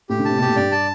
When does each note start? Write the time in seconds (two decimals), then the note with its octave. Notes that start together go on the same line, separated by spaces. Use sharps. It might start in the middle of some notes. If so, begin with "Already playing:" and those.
0.09 A2 G4
0.19 D3
0.25 C3 A5
0.38 B2 G4
0.47 A2
0.56 G2 D5
0.72 A5